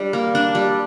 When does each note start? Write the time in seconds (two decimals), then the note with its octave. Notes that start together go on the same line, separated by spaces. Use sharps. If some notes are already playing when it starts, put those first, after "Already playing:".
Already playing: G3 D4
0.13 A#3
0.35 D4
0.55 G3